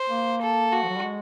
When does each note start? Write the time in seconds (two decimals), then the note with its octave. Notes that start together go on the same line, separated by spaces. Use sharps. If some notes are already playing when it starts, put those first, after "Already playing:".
Already playing: C5
0.10 A#3
0.42 A4
0.72 F#4
0.83 F3
0.89 F#3
0.97 G3
1.03 G#3